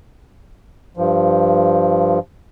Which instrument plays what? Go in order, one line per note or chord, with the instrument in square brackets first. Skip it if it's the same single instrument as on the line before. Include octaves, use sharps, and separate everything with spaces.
[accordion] G2 F3